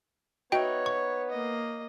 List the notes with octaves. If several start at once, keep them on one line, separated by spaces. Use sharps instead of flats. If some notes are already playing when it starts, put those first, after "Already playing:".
B3 D#4 F#4 B4 C#5 E5 G5
C#6
A#3 D#5